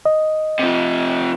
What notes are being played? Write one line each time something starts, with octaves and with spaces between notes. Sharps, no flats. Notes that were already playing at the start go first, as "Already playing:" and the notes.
D#5
C3 F3